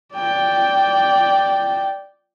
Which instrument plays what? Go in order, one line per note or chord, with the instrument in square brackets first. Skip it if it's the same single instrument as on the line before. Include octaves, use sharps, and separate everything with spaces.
[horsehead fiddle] D5 G5